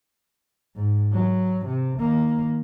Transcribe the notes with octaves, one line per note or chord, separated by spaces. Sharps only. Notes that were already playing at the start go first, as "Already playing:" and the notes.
G#2
F#3
C3
D#3 A#3